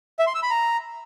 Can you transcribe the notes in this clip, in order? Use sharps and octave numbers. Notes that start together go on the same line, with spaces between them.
E5
C6
E6
B5
A#5